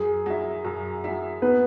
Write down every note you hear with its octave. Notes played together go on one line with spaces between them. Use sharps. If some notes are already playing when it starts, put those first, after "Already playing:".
Already playing: F#2 G#4
F#3 E4
F#2
F#3 E4
B3 B4